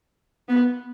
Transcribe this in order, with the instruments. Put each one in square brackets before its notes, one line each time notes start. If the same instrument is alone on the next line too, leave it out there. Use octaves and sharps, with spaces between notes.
[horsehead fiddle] B3